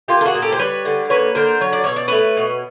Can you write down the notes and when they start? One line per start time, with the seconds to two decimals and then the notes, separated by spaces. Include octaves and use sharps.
0.08 A#3 F4 G4
0.21 A4
0.26 F#4 G#4
0.35 A#2
0.42 G4 A4
0.52 C5
0.59 G3 B4 C#5
0.85 D3
1.10 A#3 B4 C#5
1.35 D3 A#4 C5
1.61 F#3 C#5
1.73 D5
1.84 B2 C#5
1.96 D5
2.08 A3 B4 C#5
2.37 B2